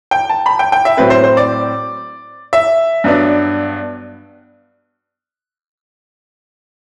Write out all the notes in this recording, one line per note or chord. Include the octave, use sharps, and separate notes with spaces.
G5
A5
B5
G5
G5
E5
A2 F#3 C4 B4
C5
C5
D5
E5
G2 F#3 B3 D4